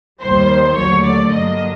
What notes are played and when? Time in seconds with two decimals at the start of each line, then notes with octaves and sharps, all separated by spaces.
0.20 D#2 D#3 G3 C5
0.75 D#2 D3 F#3 A3 C#5
1.03 D5
1.31 G2 D3 F#3 A#3 D4 D#5